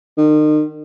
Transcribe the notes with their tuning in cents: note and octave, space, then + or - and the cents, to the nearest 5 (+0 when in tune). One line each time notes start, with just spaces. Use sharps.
D#3 -35